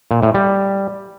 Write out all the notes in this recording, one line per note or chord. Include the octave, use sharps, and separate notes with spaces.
A#2
A2
G3